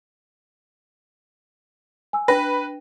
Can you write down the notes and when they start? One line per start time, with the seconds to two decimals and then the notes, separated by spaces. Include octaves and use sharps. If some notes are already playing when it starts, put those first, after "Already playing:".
2.13 G#5 E6
2.28 D4 B4 G5 A#6